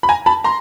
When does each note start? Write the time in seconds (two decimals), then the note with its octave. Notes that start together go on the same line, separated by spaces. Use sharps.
0.03 B5
0.09 G#5 A#5
0.26 A5 B5
0.44 A#5 C6